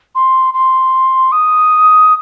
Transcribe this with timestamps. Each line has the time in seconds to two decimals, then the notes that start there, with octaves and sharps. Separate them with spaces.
0.15 C6
0.54 C6
1.32 D#6